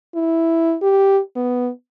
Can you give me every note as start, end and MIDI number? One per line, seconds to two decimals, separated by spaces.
0.15 0.76 64
0.82 1.20 67
1.36 1.70 59